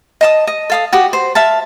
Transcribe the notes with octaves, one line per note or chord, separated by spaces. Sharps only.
D#5 A5 D#6
D#5
A4 F5 D#6
F#4 G4 D#6
C5
E5 F5 A5